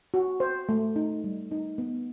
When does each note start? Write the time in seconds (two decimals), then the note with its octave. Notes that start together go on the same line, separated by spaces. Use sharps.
0.14 F#4
0.40 C5
0.69 A3
0.96 D#4
1.24 G3
1.51 D#4
1.78 B3